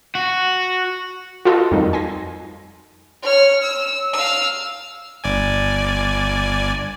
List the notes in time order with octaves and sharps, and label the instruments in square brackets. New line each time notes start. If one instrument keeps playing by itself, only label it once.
[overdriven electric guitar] F#4
[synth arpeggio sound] F4 F#4 A4 B4 D#5
F2 D#3 G3 D#4
G#5 C6 A#6
[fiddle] C#5 F6
E6
F5 E6
[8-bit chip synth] G1 D5 G#5